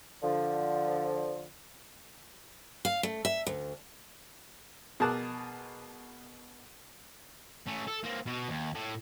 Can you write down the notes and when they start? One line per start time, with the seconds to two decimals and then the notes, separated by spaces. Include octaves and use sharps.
0.23 D3 F3
2.85 F5
3.03 A3
3.25 E5
3.47 D2
5.00 B2 G#4 A#4 A5 D6 F#6
7.67 A3 C#4
7.88 A4
8.04 A#3 C4
8.26 B2
8.49 D#2
8.75 A2